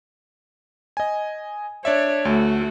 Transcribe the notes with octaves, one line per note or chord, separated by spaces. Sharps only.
D#5 G#5
D4 C#5 D5 E5
D2 A3 F#4